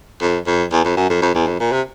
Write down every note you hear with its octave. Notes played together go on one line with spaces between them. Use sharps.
F2
F2
E2
F2
F#2
F2
F2
E2
F2
A#2
C3